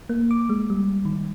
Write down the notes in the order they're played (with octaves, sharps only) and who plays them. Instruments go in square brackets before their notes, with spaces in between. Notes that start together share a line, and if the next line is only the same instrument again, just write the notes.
[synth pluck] A#3
D6
G#3
G3
D#3